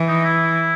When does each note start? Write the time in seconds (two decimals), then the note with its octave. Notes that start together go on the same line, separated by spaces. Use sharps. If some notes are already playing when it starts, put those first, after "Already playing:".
Already playing: E3
0.08 D#4
0.25 E4